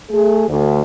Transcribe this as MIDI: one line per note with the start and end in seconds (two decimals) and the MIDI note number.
0.10 0.44 57
0.10 0.44 68
0.48 0.81 38